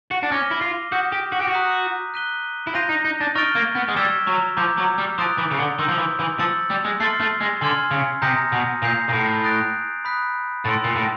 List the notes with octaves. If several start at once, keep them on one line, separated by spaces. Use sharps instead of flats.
F#4
D4
C#4 D6 F6 A#6 D#7 G7
E4
F4
F#4 D#6 G6 B6 E7
G4
F#4
G4
F#4
A#5 D#6 F#6 B6 D#7
F#6 B6 D#7 G7
E4
F4 G6 A#6 D#7
D#4
D#4
D4
D#4 C#6 F6 A6 D7 G7
A#3
B3
G#3
G3 E6 G#6 B6 E7 G7
F#3
F3 A#5 D6 G6
F#3
G3
F3 D#6 F#6 A6 D7 F7
E3
C#3
D3
D#3 C6 E6 G6
F3
E3
E3
F3 E6 A6 C#7 F#7
G3
G#3
A3 C6 F6 A6 C7
A3
G#3
D3 G#5 C6 F6 G#6
C#3
C3 A#5 D#6 G6 A#6 C#7
B2
A#2 G6 C7 F7
A#2
A2
D#6 F#6 A6 D7
B5 D#6 F#6 B6
A2 C6 E6 A6
A#2
A2